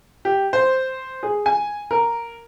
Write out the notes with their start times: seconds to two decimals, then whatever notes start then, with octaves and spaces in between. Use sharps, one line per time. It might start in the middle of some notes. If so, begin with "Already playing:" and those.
0.25 G4
0.53 C5
1.23 G#4
1.46 G#5
1.91 A#4